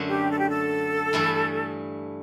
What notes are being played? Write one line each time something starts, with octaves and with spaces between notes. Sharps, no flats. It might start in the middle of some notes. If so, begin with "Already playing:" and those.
Already playing: F#2 D3 A3
G4
A4
G4
A4
G2 E3 A3 E4